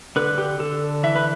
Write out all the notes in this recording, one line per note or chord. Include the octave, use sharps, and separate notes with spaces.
D3 B4
G4
D3 A4
E3 E5
B4